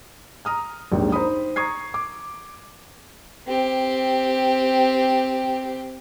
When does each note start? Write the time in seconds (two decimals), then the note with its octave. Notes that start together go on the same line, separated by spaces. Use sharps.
0.45 A#5 D#6 F6
0.92 A#1 D#2 G#2
1.12 D#4 C5 A#5 B5 D#6
1.56 A#5 C#6 D#6 G#6 C7
1.94 D6
3.48 C4 G4